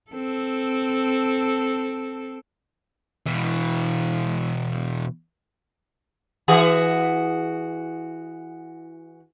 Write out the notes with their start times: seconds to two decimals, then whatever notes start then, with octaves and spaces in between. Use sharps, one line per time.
0.11 C4 A4
3.26 B2 E3
6.48 E3 F#4 G#4